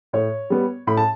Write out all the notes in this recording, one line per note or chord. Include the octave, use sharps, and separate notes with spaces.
A2 C#5
G3 B3
A2 B5
A5